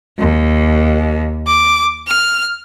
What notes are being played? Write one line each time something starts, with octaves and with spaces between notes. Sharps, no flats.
D#2
D6
F6